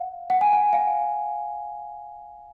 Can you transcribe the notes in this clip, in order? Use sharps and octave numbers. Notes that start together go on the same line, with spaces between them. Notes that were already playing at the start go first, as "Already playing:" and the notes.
Already playing: F5 F#5
F#5
G#5
F#5
F5